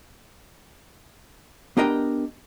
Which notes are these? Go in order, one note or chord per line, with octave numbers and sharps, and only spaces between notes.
B3 D4 G4 A#4 D#5 G5